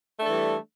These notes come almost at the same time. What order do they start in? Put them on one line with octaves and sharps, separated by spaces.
A3 D4 A4 E3 G3